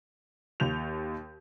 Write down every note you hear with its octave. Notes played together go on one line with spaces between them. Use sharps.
D#2 G6 F7